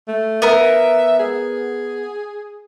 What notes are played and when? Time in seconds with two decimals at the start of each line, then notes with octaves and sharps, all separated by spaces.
0.08 A3
0.42 B3 A#4 E5
1.19 G#4